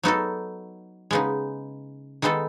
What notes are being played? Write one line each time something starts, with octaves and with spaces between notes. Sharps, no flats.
F#3 B3 D#4 F#4 A4
C#3 G#3 B3 D#4
D#3 G#3 B3 D#4 A4